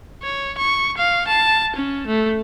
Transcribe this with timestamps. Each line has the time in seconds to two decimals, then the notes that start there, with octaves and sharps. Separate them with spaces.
0.23 C#5
0.58 C#6
0.98 F5
1.28 A5
1.76 C#4
2.07 A3